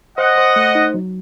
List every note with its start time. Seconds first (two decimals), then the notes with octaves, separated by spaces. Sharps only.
0.18 C5 D#5 F#5
0.38 C5
0.56 A3
0.75 D#4
0.94 F#3